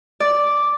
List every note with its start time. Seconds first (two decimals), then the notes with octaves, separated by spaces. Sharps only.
0.20 D5